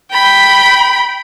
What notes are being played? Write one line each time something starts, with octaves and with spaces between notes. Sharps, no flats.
G5 B5